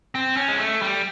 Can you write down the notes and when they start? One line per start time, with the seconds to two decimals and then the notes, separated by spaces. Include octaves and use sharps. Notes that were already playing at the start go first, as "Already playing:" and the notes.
0.15 C4
0.37 C#4
0.48 G#3
0.59 A3
0.82 G3